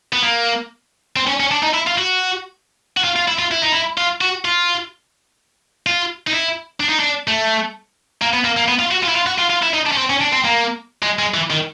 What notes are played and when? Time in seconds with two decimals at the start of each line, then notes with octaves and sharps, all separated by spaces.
0.13 B3
0.23 A#3
1.16 C4
1.27 C#4
1.40 C#4
1.52 D4
1.63 D#4
1.74 E4
1.87 F4
1.98 F#4
2.97 F#4
3.04 F4
3.16 F4
3.28 E4
3.39 F4
3.51 E4
3.62 D#4
3.72 E4
3.97 F4
4.21 F#4
4.45 F4
5.87 F4
6.27 D#4
6.33 E4
6.80 D4
6.89 D#4
6.99 D4
7.28 A3
8.22 A#3
8.33 B3
8.44 A#3
8.57 A#3
8.68 B3
8.79 F4
8.91 F#4
9.04 F4
9.09 E4
9.16 F4
9.27 F#4
9.39 F4
9.50 F4
9.63 E4
9.74 D#4
9.86 D4
9.92 C#4
9.98 C4
10.10 C#4
10.21 D4
10.33 C4
10.45 A#3
11.03 G#3
11.19 G#3
11.34 E3
11.50 D#3